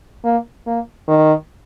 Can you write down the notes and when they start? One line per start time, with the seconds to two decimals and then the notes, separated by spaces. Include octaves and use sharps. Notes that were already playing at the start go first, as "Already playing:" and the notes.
0.24 A#3
0.67 A#3
1.08 D#3